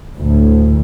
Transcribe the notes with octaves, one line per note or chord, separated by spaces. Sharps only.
D2 A2